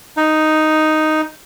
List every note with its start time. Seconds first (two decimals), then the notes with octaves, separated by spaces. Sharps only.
0.17 D#4